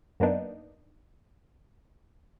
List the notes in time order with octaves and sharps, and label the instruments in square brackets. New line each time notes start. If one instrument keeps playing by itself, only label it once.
[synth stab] F#2 A#3 B3 D4 D#4